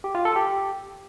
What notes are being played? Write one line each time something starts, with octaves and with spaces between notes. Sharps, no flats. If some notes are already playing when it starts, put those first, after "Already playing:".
G4
F4
A4
G4